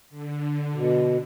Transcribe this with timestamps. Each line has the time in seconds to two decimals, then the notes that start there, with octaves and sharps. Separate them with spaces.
0.10 D3
0.74 B2